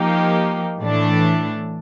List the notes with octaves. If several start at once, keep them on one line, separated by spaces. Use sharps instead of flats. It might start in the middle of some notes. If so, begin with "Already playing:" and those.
Already playing: F3 A#3 D#4 G4
A2 E3 A3 D4